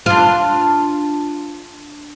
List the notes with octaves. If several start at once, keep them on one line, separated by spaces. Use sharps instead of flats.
D4 F4